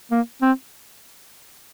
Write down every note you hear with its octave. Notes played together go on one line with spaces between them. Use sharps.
A#3
C4